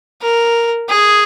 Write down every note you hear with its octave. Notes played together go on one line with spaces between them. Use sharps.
A#4
G#4